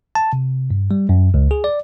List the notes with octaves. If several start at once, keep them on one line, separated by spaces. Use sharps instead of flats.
A5
C3
G2
G3
F#2
C#2
G#4
D5